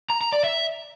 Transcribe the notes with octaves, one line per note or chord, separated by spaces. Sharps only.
A#5
A#5
D5
E5